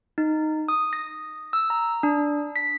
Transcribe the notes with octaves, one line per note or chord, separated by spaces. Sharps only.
D#4
D#6
A#6
E6
A#5
D4
B6